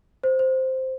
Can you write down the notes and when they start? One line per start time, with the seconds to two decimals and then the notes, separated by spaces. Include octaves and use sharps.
0.23 C5
0.39 C5